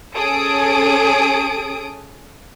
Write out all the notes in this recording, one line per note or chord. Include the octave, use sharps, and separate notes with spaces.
C#4 G#4 A4 D#6 D7